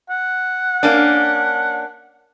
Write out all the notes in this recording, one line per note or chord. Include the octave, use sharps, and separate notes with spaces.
F#5
A#3 C#4 D4